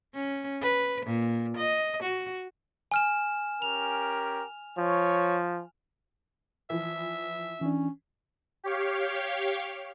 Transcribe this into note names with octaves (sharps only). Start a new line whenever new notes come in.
C#4
B4
A#2
D#5
F#4
G#5 F6 E7
C#4 G4 A#4 F7
F3 C#5
E3 F3 E5
E3 C#4 D4
G4 C#5 F5